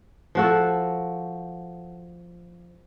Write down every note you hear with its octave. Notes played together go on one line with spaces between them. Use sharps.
F3 F#4 A4